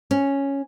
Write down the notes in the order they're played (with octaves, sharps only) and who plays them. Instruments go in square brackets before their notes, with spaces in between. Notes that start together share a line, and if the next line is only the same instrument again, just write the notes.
[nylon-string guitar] C#4